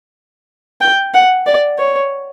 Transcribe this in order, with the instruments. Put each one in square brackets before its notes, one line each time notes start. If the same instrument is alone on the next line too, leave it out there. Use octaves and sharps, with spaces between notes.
[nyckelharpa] G5
F#5
D5
C#5